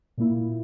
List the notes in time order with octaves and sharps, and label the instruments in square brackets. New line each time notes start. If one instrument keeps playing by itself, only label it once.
[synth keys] A#2 A#3 E4